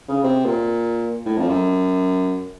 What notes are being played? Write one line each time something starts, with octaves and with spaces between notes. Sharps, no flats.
C#3
C3
A#2
A2
F2
F#2